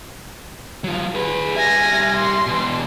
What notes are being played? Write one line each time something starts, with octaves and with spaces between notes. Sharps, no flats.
F#3 F4
G#4 B4
G3 E5 G#5 A#6
C6
B2 E3